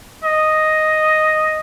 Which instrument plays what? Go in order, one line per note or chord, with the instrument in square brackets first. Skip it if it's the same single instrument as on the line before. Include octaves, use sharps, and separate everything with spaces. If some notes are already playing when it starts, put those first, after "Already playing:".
[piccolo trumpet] D#5